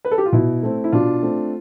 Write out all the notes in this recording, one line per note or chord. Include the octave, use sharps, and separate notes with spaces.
B4
A4
G4
F4
B2 E4
A3 C4
E4
B2 D4 F4
A3 C4